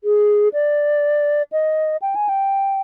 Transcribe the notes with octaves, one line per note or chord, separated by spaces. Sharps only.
G#4
D5
D#5
G5
G#5
G5